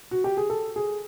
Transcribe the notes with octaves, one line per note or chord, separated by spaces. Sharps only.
F#4
G4
G#4
A4
G#4